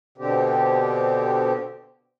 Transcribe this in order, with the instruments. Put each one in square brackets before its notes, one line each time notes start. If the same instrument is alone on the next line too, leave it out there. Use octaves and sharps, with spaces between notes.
[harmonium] B2 D3 C4 G4